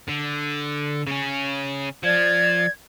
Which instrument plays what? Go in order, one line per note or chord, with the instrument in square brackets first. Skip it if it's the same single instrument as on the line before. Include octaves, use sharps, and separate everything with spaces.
[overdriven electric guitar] D3
C#3 C#4
[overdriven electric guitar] F3 [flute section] D5 G#6